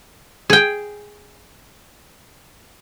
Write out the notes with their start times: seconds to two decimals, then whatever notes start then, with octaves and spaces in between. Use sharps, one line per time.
0.50 G#4 G5